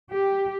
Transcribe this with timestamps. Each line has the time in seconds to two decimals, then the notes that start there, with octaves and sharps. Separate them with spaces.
0.11 G4